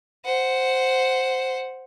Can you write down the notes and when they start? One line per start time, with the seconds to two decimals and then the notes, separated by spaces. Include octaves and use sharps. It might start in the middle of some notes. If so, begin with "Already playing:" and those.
0.25 C5 F#5